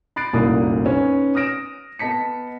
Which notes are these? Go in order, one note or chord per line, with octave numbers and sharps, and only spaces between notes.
B5 F#6 A6 C7 D7
F1 C2 F#2 A#2 D5 D#6
C#4 D#4 B4
D#6 F6 A#6 D7 E7
B3 D#5 A5 B6 C#7